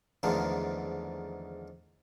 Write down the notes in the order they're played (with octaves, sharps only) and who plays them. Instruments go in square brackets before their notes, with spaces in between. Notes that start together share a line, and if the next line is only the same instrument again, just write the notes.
[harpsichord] E2 G#2 D3 D#3 F3 A3